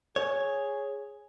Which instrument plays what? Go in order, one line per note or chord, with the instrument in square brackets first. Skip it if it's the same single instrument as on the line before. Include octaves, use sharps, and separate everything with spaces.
[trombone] G#4 [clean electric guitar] C#5